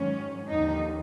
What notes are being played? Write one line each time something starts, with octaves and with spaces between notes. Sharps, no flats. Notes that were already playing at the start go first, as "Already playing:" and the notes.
Already playing: G#2 D#3 F#3 C#4
D#2 D3 F3 D#4